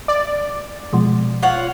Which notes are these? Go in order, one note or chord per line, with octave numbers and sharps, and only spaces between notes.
D5
B2 F3 G#3
F4 C#5 F#5